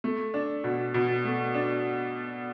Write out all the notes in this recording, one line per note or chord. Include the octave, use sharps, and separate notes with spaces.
A3
D4
B2
B2
A3
D4